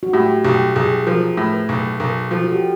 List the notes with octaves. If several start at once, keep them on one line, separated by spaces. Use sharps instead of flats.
F#4
A2 G4
B1 G4
B1 G#4
F3 A#4
A2
B4
B1
B1 A#4
F3 A4
F#4
G4